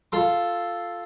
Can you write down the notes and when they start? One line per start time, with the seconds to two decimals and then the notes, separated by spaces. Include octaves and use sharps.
0.12 F4 A4 C6